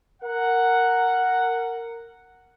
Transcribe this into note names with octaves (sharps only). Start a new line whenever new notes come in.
A#4 F#5